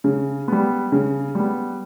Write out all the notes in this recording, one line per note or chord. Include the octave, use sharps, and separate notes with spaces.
C#3
G3 B3
C#3
G3 B3